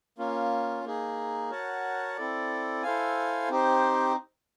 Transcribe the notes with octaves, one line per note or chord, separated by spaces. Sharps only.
A#3 C#4 F4
A#3 D#4 G#4
F#4 A#4 C#5 F#5 A5
C4 E4 A4 D5
E4 A4 C5 F5 G#5
C4 D#4 G4 C5